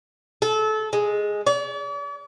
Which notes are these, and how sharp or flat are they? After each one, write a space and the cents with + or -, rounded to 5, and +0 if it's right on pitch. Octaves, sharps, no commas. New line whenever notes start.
A4 -25
G#3 +0
D5 -45